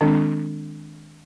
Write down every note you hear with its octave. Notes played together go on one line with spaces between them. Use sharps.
D#3 G#3 C4 D4